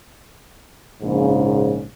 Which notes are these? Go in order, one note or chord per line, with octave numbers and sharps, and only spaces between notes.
A#1 G#2 C#3